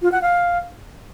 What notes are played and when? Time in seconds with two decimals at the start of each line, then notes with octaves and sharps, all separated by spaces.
0.02 F4
0.12 F#5
0.22 F5